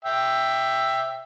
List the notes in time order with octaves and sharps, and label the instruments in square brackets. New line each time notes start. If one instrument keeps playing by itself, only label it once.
[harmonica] E5 G5